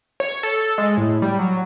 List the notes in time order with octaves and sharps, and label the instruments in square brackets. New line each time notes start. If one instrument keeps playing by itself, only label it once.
[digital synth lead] C#5
A4
G#3
A2
G3
F#3